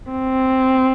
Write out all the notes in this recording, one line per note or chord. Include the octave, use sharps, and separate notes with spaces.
C4